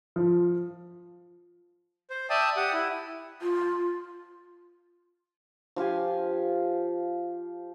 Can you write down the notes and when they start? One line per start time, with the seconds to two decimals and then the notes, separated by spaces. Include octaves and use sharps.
0.16 F3
2.10 C5
2.30 D5 E5 G5 A5 D#6
2.57 G4 F#5 D#6
2.73 E4
3.41 F4
5.76 F3 F4 G4 G#5